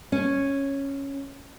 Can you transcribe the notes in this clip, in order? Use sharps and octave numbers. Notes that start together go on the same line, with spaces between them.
C#4